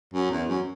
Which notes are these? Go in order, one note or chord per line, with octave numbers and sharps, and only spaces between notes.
F#2
E2
F#2